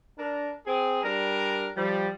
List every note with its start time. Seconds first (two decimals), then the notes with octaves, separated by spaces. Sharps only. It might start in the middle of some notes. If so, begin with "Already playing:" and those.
0.19 D4 A#4
0.66 C4 G#4
1.03 G3 D4 A#4
1.76 F3 G3